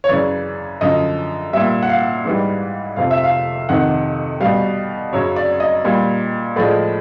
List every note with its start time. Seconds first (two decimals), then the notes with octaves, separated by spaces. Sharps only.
0.04 C#5
0.09 F#2 C#3 E3 D5
0.81 F#2 D3 F3 D#5
1.53 A#2 G3 E5
1.82 F#5
1.89 F5
2.25 G#2 E3 G3
2.96 F2 C3 F3 F5
3.11 E5
3.24 F5
3.69 F2 C3 D#3 F#5
4.40 B2 G3 F5
5.13 F#2 C#3 F#3 C#5
5.36 D5
5.60 D#5
5.85 A#2 G3
6.56 A2 F3 G#3 D5